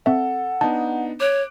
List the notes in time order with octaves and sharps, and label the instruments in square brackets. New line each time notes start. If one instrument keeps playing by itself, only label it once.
[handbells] C4 E5 [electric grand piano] A4 [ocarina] F#5
[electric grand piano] B3 D4 D#4 [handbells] A5
[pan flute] C#5 [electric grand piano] D6 F#6 D7